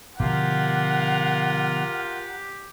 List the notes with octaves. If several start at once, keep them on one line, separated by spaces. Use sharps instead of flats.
B2 D3 F3 F4 G4 A#4 F5 F#5